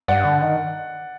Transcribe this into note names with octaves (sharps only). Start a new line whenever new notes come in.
G2 D5 F#5
D3
D#3